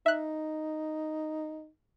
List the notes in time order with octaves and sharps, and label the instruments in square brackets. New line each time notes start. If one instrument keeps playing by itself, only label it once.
[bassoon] D#4 [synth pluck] E5 F#6